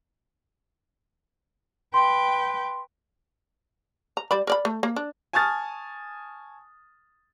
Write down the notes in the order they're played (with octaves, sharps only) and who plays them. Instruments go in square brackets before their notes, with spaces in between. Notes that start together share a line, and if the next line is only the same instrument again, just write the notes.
[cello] B4 G5 [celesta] C6
[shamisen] A#5
G3 D5 B5
A#4 D5 B5
A3
A#3
D4
[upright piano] G#5 A5 C#6 D#6 F6 A6